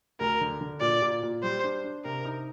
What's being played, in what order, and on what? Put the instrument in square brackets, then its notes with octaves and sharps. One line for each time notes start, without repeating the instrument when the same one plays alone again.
[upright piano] D2 [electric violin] A#4
[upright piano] D3
D3
[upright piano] A#2 [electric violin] D5
[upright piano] A#2
A#2
[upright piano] G3 [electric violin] C5
[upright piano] D4
D4
[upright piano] C3 [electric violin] A#4
[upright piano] D#4